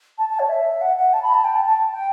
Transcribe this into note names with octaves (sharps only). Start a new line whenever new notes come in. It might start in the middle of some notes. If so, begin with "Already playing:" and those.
A5
A5
C#5
E5
F#5
F#5
A5
B5
A5
G5
A5
A5
G5